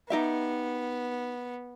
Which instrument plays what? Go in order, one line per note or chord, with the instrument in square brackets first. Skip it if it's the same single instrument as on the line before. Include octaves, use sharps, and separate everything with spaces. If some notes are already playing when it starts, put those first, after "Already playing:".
[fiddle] B3 [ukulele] D#4 G4 E5